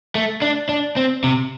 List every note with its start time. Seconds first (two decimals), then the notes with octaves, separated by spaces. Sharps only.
0.15 A3
0.42 D4
0.69 D4
0.97 C4
1.24 C3